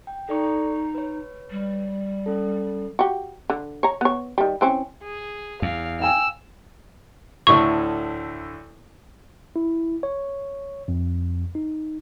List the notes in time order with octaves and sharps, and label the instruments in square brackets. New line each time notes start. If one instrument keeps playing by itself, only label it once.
[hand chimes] G5
[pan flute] D#4 [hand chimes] A4 D5 C#6
[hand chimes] B4 C#5
[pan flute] G3
[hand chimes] C#4 A4
[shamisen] F#4 G4
D3
C#5 A#5
B3 C#5
D#3 G3
E3 C4 C#4
[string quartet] G#4
[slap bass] E2 [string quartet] F5
[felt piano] F5 G5 G#5 [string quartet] E6 F6
[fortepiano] D2 A2 E4 [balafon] C#6
[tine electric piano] E4
C#5
F2
D#4